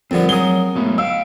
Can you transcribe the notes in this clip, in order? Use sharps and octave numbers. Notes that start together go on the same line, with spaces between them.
F2 D3 G3 C4 A#4 F#5
F#3 G#4 A#4 D#6 G7
F#3 G#3 A3 B3
D#5 F5 E6 D7